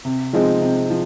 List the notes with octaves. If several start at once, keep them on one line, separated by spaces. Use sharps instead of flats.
C3
F3 G#3 C4 D#4
C3
F3